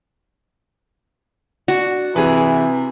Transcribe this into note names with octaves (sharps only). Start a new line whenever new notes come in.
D4 F#4
C3 E3 G#4 B4